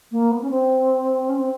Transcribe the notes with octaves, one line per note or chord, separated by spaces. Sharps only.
A#3
B3
C#4
C4
C#4
C4